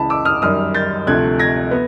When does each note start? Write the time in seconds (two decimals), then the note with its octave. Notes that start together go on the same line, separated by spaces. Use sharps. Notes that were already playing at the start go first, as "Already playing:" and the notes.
Already playing: C#2 C#3 E3 A5 B5
0.10 D6 E6
0.25 D#6 F6
0.42 F#2 D#3 G3 D#6 F6
0.75 G6 A6
1.07 D2 C3 F3 A3 F#6 G#6
1.39 G#6 A#6
1.71 B3